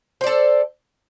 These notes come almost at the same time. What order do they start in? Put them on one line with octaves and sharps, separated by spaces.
C5 D5 A4